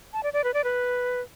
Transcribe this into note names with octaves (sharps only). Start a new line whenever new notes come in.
A5
D5
D5
B4
D5
B4